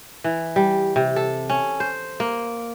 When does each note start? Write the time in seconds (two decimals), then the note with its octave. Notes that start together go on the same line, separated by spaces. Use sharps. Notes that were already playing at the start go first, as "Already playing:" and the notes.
0.24 E3
0.56 G3
0.96 C3
1.16 A4
1.50 C#4
1.80 C5
2.20 A#3